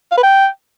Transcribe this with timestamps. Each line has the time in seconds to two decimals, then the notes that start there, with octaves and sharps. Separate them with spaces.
0.12 F5
0.17 B4
0.23 G5